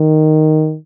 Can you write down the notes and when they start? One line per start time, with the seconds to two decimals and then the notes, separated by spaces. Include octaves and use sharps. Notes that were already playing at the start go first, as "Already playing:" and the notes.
Already playing: D#3